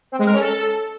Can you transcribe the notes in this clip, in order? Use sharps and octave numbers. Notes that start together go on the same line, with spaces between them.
C4
G#3
A#4
C#4
A4